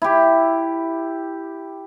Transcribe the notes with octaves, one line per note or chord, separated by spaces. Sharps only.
E4 G4